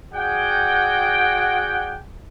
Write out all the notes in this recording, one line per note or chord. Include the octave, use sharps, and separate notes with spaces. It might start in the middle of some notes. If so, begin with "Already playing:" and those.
F#4 G#4 D5 F#5 G5